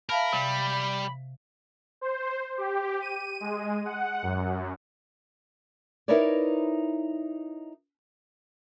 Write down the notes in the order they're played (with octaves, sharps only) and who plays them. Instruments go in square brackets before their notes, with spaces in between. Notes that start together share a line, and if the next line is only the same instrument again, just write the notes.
[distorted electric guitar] A#4 [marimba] E5 F5 A5 [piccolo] B5
[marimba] C3 [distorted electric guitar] G3
[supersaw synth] C5
G4
D#7
G#3
F#5
F#2
[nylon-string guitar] D#4 E4 A#4 B4 C#5 D5